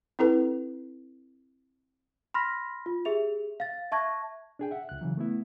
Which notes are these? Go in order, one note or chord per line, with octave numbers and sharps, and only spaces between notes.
C4 E4 A4 B4
B5 C6 F6 A#6 B6
F4
G4 G#4 E5 F7
F5 A6
E5 A5 C#6 F#6 G#6 A#6
D4 G#4 G5
E5 F#5
C#2 F#6
C#3 E3 F#3
A3 B3 E4